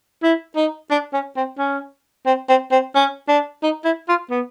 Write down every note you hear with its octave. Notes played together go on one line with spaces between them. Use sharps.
E4
D#4
D4
C#4
C4
C#4
C4
C4
C4
C#4
D4
D#4
E4
F4
B3